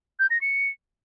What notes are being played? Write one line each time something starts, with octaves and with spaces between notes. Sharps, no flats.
G6
A#6
C#7